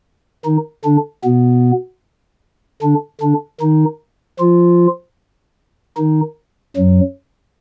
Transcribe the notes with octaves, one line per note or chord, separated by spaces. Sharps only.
D#3 D#4
D3 D4
B2 B3
D3 D4
D3 D4
D#3 D#4
F3 F4
D#3 D#4
F#2 F#3